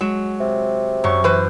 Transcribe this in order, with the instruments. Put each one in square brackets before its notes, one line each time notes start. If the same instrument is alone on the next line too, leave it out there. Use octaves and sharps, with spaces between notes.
[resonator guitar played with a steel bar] F#3 [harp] G#3 E7
[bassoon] C3
[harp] F#2 C#6 [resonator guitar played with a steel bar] F#3
[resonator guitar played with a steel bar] E3 B4 C5